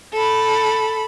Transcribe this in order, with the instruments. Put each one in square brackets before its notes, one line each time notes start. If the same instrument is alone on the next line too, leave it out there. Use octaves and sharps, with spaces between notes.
[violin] A4 B5